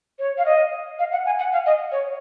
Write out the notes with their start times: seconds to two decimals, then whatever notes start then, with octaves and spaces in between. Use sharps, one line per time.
0.19 C#5
0.38 F5
0.46 D#5
0.99 F5
1.12 F#5
1.26 G#5
1.39 F#5
1.53 F5
1.66 D#5
1.92 C#5